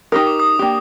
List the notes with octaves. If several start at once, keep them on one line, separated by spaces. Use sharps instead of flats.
D#4 G4 A#4 D#6
D6
D#6
A#3 D4 G4